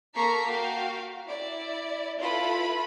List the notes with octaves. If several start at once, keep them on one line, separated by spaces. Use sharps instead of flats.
A#3 A4 A#5 C#6 B6 C7
F#4 F5 G5
E4 D5
E4 F4 A4 B4 B5